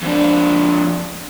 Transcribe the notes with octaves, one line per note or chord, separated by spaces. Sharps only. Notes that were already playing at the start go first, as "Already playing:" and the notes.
F2 D4